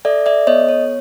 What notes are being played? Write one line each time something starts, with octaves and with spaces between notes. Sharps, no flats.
A4 D5 E5
D5 E5
B3 C#5 D#5
C#5